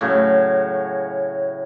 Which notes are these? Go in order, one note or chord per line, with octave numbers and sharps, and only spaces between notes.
A2 C#3 F#3